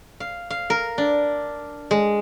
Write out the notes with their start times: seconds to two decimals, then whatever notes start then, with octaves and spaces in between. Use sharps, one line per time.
0.20 F5
0.50 F5
0.70 A#4
0.98 D4
1.91 G#3